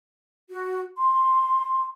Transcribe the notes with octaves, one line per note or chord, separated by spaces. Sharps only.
F#4
C6